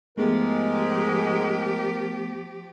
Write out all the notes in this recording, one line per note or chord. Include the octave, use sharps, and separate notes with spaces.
G#2 F3 G#3 A3 B3 G4 A#4